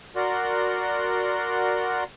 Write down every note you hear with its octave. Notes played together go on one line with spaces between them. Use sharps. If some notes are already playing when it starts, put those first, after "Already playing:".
F#4 A#4 D5 F#5 C6